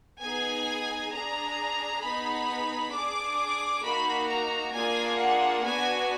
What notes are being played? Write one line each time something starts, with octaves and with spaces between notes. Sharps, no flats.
B3 D#4 G#4 G#5
D4 G#4 A#5
B3 D#4 G#4 B5
D4 G#4 D6
A#3 D#4 F#4 B5
A#5
A#3 D4 F4 G#4 G#5
F#5
B3 D4 F#4 G#5